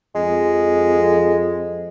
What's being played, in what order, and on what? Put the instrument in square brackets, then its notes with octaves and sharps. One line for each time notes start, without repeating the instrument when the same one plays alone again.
[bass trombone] F2 [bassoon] G#3